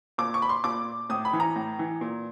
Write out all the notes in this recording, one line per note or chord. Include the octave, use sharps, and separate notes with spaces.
A#2 D6
C#6
B5
C6
A#2 D6
A2 D#6
B5
E3
A#5
A2
E3
A#2